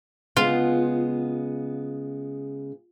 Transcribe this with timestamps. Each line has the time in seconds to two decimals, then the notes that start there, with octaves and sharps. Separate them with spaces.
0.36 C#3 G#3 B3 F4